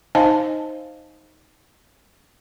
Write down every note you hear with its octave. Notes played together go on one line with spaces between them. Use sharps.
D#4 C5 D#5 F5 G#5 A5